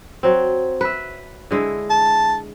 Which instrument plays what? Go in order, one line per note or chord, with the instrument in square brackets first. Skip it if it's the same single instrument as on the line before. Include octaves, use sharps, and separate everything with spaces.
[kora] F#3 C4
B4 E5
D3 G#3 E4
[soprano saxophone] A5